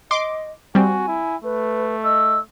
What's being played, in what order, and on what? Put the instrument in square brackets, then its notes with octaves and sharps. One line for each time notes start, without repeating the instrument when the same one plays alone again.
[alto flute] D#5 [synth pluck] C6 D6
[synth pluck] G3 C4 [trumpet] F#4 [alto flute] G#5
[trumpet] E4
[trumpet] A3 [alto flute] B4
[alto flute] D#5 [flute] E6